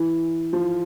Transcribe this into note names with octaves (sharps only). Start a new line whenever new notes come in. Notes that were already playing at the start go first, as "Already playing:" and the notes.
Already playing: E3
F3